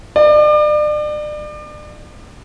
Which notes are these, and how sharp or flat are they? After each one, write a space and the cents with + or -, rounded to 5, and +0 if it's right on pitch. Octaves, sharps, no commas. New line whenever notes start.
D5 +35